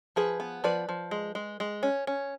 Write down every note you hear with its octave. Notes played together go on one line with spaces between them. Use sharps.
F3 G#4 B4
B3
F3 B4 D5
F3
G#3
G#3
G#3
C#4
C#4